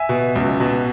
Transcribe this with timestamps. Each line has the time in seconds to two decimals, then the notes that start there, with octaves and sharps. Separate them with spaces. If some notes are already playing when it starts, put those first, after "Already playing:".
Already playing: E5 G#5
0.09 B2
0.35 C#2
0.60 B2